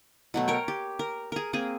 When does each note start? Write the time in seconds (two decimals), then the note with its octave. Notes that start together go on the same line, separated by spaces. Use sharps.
0.34 B2 F#3 A3
0.48 A#4 C#5 G5
0.68 G4
0.99 A#4
1.32 G#4 A#4
1.53 A#3 C4 G#4